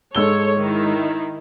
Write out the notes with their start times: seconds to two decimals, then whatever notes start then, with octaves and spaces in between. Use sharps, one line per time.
0.15 G#2 A4 C#5 E6 G7
0.57 D#3 E4